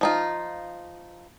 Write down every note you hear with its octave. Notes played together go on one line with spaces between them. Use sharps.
F3 D#4 F4